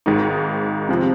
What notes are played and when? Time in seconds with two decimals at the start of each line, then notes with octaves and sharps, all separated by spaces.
0.06 G#1 G#2 D#3 G#3 D#4
0.89 C3 F3 C4